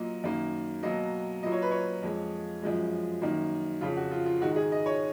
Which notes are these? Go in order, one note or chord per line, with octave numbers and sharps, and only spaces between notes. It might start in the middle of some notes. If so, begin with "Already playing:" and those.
Already playing: A#2 F#3 A#3 D#5
F#2 D#3 A#3
B2 F#3 A#3 D#5
A#2 F#3 A#3 D#5
C#5
B4
C#5
F2 F3 G#3
F#2 F3 G#3
F#2 D#3 A#3
F2 C#3 F3 F4
F#4
F4
F4
G#2 D#3 G#3 F#4
G#4
D#5
C#5